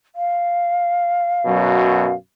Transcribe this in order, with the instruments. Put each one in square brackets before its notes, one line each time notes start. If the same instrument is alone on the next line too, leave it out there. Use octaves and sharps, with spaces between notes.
[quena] F5
[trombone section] F#2 B2 F#3